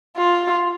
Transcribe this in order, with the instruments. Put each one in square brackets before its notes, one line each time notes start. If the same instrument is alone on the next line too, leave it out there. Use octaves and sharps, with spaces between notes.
[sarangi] F4